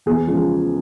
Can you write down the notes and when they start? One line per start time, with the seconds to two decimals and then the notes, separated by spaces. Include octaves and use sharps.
0.06 E2 G#4
0.27 C#3 F3 G#3